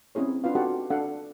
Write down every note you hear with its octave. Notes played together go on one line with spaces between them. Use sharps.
C4 C#4 E4 G#4 C#5
D4 F4 B4 F5
D#4 F#4 G4 A4 F#5 A5
D4 A4 F5 F#5